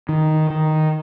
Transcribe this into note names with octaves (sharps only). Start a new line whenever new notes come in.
D#3
D#3